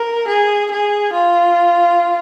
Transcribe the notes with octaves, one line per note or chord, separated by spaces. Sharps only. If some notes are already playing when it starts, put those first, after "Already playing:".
Already playing: A#4
G#4
G#4
F4